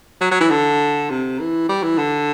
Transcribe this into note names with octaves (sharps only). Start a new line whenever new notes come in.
F#3
F#3
E3
D3
C3
E3
G3
E3
D3